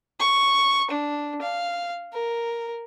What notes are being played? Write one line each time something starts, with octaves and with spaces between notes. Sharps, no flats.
C#6
D4
F5
A#4